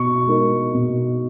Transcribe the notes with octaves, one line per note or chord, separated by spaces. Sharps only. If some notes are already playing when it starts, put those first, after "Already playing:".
Already playing: B2 C#6
G#3 D#4 A#4
B2